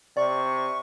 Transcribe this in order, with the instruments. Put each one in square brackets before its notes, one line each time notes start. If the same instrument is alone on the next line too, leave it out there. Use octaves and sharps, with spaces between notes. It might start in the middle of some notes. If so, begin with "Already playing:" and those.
[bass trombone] C3 [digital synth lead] D5 [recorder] C#6